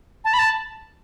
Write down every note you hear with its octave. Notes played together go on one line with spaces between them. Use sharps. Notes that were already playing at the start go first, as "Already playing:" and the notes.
A5
B5
A5